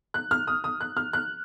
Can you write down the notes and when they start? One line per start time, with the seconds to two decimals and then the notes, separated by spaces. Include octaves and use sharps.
0.14 F#6
0.31 F6
0.47 D#6
0.64 D#6
0.81 F#6
0.97 F6
1.13 F#6